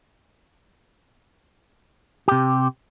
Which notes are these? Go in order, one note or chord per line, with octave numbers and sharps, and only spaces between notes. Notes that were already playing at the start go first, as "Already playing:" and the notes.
C3 G4